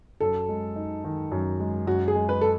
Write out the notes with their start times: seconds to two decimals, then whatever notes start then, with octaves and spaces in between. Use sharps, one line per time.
0.20 F#2 A4
0.48 G#3
0.76 D#4
1.04 D#3
1.32 F#2
1.59 G#3
1.87 F#2 F#4
2.08 G#4
2.15 G#3
2.29 B4
2.41 A4